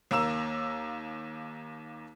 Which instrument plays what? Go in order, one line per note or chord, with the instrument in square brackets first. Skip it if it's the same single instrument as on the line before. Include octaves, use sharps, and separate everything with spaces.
[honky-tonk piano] D#2 A#3 A#5 E6 E7